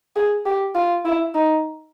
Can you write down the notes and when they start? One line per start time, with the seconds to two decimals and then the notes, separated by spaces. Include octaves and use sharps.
0.16 G#4
0.46 G4
0.75 F4
1.05 E4
1.34 D#4